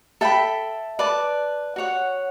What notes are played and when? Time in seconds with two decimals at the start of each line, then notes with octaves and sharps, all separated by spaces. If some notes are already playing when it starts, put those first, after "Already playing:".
0.21 A4 E5 G5 B5
0.99 B4 D5 A5
1.76 F#4 C#5 F#5